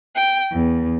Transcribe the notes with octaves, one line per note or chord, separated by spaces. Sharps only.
G5
E2